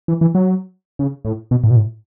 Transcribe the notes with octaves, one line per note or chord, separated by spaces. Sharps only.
E3
E3
F#3
C#3
A2
B2
A2
B2
A2